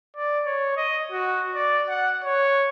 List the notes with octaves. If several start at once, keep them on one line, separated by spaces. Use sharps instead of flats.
D5
C#5
D#5
F#4
D5
F#5
C#5